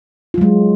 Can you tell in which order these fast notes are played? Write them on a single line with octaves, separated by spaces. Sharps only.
F4 F#3 G#3